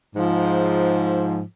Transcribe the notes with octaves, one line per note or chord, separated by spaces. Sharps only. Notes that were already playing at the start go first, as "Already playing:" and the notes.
G#2 F3